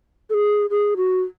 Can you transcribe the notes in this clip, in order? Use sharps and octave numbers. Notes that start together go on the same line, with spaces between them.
A4
G#4
G#4
F#4